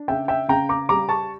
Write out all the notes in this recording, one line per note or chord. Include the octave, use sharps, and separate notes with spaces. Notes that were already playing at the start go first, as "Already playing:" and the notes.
Already playing: D4
C#3 E5 G5
E5 G5
C#3 G5 A#5
A#5 D6
G3 A#5 D6
A5 C#6